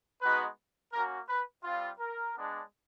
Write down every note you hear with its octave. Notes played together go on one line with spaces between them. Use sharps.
G#3 B3 D#4 F#4 B4
A#3 C#4 F#4 A#4
B4
G3 C4 F4
A#4
G#3 B3 D4